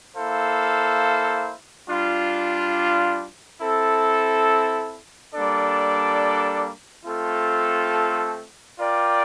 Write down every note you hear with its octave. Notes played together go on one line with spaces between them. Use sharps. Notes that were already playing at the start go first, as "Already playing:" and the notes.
A#3 E4 A4 C5 F5
G3 D4 F4
C4 E4 A4
G3 A#3 D4 A4 D5
A3 C4 F4 A4
F4 A#4 D5 G5